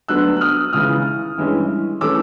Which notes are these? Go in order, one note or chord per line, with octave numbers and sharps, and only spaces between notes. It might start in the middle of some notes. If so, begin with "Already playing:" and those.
D2 D3 F#3 B3 D4 E6 F#6
F#6
D#6 F6
C#2 C#3 E3 D#6 F6
G2 E3 G#3 C#4
E3 A3 C#4 D6 E6